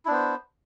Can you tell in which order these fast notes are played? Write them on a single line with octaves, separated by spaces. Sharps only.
E4 D4 B3 C5